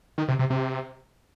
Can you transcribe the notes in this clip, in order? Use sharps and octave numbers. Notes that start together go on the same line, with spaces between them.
D#3
C3
C3
C3